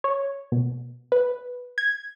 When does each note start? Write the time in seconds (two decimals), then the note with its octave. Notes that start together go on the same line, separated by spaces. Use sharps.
0.04 C#5
0.52 B2
1.12 B4
1.78 G#6